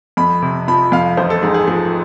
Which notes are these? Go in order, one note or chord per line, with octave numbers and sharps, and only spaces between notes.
F2 B5
C3
F3 B5
F2 F5
A1 C5
A4
G#2 G#4
G#4
F3 G#4